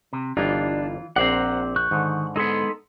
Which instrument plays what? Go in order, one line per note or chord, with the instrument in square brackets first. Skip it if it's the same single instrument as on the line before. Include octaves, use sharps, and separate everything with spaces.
[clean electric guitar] C3
[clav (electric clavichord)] G1 G3 D#4 [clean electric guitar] E3 F4 [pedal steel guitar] D4
[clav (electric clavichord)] A#1 [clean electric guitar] C4 C5 D5 [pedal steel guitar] F#5 A#5
[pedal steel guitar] C#6 F#6 G6
[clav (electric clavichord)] G#2 D3 [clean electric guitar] D#3
[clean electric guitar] G#3 B3 [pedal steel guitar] D#4 A4 C6